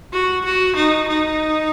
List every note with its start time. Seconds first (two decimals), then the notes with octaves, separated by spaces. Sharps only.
0.13 F#4
0.45 F#4
0.75 D#4
1.07 D#4